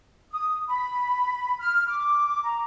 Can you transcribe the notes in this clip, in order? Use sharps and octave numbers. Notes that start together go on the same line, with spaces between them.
D#6
B5
F6
D6
A#5